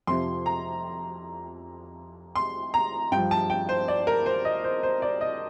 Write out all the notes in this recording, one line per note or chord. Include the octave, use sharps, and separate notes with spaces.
F2 C3 F3 C6
A#5
C6
A#5
G2 F3 G5
A5
G5
C5
D5
A#4
C5
D#5
C5
C5
D5
D#5